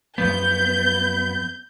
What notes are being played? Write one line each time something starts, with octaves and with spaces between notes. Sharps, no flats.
F#2 F3 A#3 B3 G6